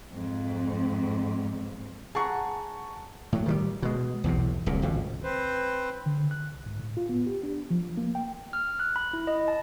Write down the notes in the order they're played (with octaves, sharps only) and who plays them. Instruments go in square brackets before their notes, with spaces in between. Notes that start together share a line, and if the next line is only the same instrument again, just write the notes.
[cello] F2 G#2
[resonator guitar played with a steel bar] G#4 F#5 [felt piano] A5 A#5 C#6
[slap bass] A2 F#3
D#3 E3 G3
B2 G#3
B1 E2 A2 C3
D1 C2 A#2
G#1 C#2 B2
[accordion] C4 B4 C5
[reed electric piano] D3
F#6
C2
G#2
A2
F4
B3
G4
D4
F3
A#3
G5
[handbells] F6
F#6
B5
E4
D#5
A5